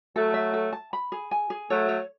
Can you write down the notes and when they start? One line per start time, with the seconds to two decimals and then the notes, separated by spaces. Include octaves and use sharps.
0.15 F#3 A3 A4
0.34 E5
0.54 A4
0.73 A5
0.93 B5
1.12 G#4
1.31 G#5
1.50 G#4
1.69 F#3 A3 C#5
1.88 C#5